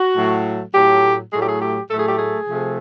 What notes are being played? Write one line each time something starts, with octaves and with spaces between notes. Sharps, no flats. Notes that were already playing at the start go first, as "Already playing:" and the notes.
Already playing: F#4
A2 F#3 A3
A2 F#3 A3 G4
A2 F#3 A3 G#4
G4
G#4
G4
A2 F#3 A3 A4
G#4
G4
G#4
C3 F3 A3